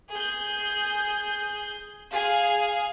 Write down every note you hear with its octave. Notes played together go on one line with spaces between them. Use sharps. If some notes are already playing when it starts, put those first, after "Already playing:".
G#4 G6
G#4 F5